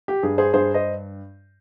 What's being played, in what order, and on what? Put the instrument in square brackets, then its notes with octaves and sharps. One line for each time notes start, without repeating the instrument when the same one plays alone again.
[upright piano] G4
G2 G#4
G#4 C5
G2 G#4 C5
C5 D#5